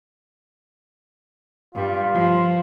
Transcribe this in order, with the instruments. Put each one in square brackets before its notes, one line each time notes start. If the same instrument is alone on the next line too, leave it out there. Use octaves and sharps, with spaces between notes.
[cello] G2 G3 [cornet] F4
[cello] F3